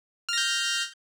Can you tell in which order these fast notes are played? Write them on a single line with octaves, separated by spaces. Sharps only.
F6 A#6 G6